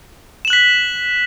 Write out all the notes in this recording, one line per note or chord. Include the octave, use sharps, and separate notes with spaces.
F#6 B6 E7 F#7